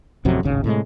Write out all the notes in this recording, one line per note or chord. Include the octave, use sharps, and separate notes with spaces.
A1 F2 C3 F#3
D1 G#1 C#3
A2 C3 F3 G#3